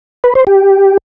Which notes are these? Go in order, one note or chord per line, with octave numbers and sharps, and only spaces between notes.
B4
C5
G4